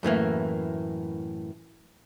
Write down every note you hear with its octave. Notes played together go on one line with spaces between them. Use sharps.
F#2 A2 E3 A#3